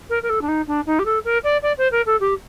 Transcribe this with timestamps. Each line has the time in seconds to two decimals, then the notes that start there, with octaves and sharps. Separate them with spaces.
0.10 A#4
0.23 A#4
0.29 A4
0.42 D4
0.48 D#4
0.67 D4
0.86 D#4
0.99 G4
1.05 A4
1.25 A#4
1.44 D5
1.62 D5
1.78 C5
1.92 A#4
2.06 A4
2.20 G4